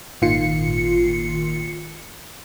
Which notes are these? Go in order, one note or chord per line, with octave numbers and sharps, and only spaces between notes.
G#1 A#2 D#3 F4 C7 C#7